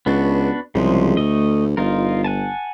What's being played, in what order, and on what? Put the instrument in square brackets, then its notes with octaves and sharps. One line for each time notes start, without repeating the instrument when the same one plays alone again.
[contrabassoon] C#2 [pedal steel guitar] B3 D4 F#4
[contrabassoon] C2 [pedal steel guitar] C#3 F3 G#3
[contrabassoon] D2 [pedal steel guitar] A3 D#5
[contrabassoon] G1 [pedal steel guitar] D#4 F4 A#4
[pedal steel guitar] F#5 G#5 A5